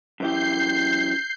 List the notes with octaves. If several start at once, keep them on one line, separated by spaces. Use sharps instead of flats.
F#2 E3 G4 G6 C7